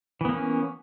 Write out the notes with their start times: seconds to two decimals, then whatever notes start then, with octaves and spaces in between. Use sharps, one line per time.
0.21 E3
0.25 B3
0.29 A#3
0.33 C#4